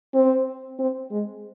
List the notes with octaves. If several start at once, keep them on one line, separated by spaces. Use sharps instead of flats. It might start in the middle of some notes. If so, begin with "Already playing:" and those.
C4
C4
G#3